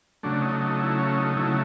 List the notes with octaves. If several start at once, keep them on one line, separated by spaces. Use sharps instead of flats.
C#3 F#3 A3 D4
D#4
D#4
E4
C#4
D#4
C#3 F#3 A3 E4